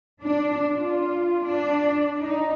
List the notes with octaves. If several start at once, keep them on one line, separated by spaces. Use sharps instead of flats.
D4
F4
D4
D#4